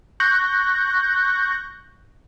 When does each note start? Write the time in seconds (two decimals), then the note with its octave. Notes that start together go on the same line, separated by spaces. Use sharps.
0.20 C#6 F#6 G6 A#6